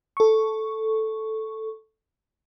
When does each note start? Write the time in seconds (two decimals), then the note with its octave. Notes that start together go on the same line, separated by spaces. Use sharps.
0.17 A4 C#6